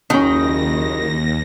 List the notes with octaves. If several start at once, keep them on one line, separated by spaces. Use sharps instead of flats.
F#1 D#2 D#3 C#4 D4 A#6